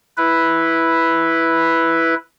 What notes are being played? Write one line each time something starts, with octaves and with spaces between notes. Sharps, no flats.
E4 B4